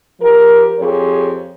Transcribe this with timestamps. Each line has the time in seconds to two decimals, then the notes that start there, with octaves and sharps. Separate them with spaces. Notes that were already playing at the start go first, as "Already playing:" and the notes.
0.21 F3 G4 A#4
0.79 F2 G4 G#4 C#5